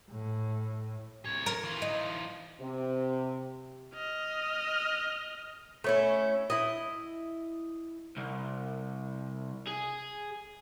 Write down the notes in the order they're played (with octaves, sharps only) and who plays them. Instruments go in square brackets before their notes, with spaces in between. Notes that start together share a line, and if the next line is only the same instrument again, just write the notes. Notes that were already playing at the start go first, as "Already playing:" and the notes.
[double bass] A2
[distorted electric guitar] C2 C#5
[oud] A#4
[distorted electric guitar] E3 F4
[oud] D#4
[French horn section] C3
[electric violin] D#5 F6
[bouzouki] A3 C#4 E4
E4 D#5
[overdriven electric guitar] C2
G#4